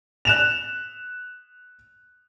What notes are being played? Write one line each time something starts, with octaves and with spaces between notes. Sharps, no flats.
F#6 E7 F7